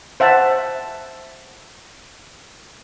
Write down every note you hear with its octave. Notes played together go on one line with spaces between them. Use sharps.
C5 E5 F#5 A5